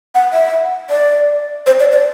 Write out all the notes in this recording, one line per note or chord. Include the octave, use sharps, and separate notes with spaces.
F#5
E5
D5
C5
D5
D5